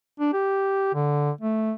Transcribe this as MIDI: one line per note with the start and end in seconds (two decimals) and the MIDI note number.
0.20 0.32 62
0.33 0.91 67
0.95 1.31 50
1.41 1.73 57